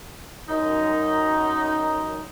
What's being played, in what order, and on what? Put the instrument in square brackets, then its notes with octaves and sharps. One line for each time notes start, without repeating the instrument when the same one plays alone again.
[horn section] F#2 D#4